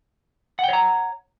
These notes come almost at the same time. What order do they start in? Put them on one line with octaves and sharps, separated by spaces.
F#5 G5 C#5 A#5